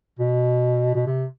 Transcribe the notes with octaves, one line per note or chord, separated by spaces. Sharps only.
B2
B2
C3